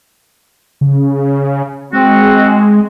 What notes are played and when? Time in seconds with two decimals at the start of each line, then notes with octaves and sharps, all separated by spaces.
0.81 C#3
1.93 G#3 C4 F#4